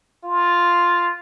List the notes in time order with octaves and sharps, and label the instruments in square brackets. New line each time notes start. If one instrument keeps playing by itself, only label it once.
[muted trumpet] F4